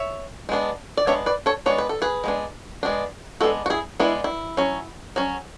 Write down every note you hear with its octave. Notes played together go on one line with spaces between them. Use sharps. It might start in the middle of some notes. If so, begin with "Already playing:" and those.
Already playing: C#5 E5
G#3 B3 D4
D5
G#3 B3 D4 C#5 E5
B4 D5
A4 C#5
G#3 B3 D4 C#5
B4
A4
G#4 B4
G#3 B3 D4
G#3 B3 D4
G#3 B3 D4 F#4 A4
F#4
E4 G#4
G#3 B3 D4 E4
E4
F#3 C#4
F#3 C#4